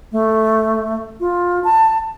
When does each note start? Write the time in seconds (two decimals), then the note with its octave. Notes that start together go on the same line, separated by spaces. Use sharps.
0.12 A3
1.20 F4
1.64 A5